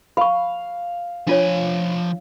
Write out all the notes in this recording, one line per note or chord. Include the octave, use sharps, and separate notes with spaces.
F5 B5 C#6
F3 D4 F4 C#5 G#5